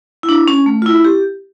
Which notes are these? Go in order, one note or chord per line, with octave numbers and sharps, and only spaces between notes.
E4
D4
C#4
A3
F4
E4
G4